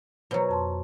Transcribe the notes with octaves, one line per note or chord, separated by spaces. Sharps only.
B2 F#3 C5 C#5 A#5
F2 A5 C6